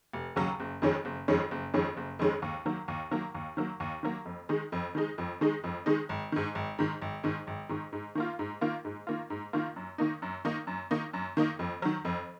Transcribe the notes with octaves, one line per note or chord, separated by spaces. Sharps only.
F1
D#2 C#3 F#3
F#1
F2 D#3 G#3 C#4
F#1
F2 D#3 G#3 C#4
F#1
F2 D#3 G#3 C#4
F#1
F2 D#3 G#3 C#4
D#2
D#3 F#3 A#3
D#2
D#3 F#3 A#3
D#2
D#3 F#3 A#3
D#2
D#3 F#3 A#3
F2
D#3 G#3 D#4
F2
D#3 G#3 D#4
F2
D#3 G#3 D#4
F2
D#3 G#3 D#4
G#1
G#2 D#3
G#1
G#2 D#3
G#1
G#2 D#3
G#1
G#2 D#3
G#2
D#3 A#3 F4
G#2
D#3 A#3 F4
G#2
D#3 A#3 F4
G#2
D#3 A#3 F4
F#2
D#3 A#3 D#4
F#2
D#3 A#3 D#4
F#2
D#3 A#3 D#4
F#2
D#3 A#3 D#4
F2
D#3 F#3
F2